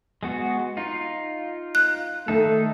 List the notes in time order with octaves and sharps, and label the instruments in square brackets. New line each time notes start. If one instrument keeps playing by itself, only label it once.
[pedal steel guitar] G#3 B3 F#4
D#4 F4
[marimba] F#6
[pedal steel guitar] D#3 D#4 A4 [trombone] A3